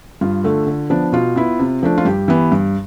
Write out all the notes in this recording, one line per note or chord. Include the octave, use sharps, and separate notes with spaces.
G2 F4
D3 A3
D3
F3 B3 D4
B2 F4
B3 E4
C3
F3 A3 D4
F4
G2 G4
E3 B3
G2